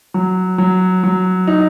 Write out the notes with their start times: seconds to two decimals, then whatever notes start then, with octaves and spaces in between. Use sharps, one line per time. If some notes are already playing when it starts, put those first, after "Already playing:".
0.14 F#3
0.58 F#3
1.03 F#3
1.47 D#4